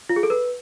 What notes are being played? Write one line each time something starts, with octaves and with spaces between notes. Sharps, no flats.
F4
G#4
A4
B4